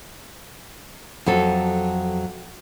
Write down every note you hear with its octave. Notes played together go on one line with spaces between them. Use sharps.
F2 F#3 A4